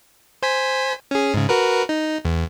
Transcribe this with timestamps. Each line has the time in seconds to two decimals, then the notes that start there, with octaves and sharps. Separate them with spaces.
0.43 C5 G#5 B6
1.11 C#4 G#4
1.34 G#2 C#3
1.49 F#4 A#4 B4
1.89 D#4
2.25 E2